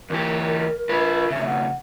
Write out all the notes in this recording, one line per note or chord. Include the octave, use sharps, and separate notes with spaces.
E2 E3 G4 A#4
F4 B4
F2 C#3 E5
F#5